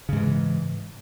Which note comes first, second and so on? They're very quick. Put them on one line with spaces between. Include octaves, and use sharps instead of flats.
C#3 G#2 E3